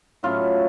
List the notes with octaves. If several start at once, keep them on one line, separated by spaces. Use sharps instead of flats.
A2 F#3 A3 C#4 F4